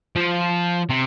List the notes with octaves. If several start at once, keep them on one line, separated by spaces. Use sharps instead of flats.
F3
C3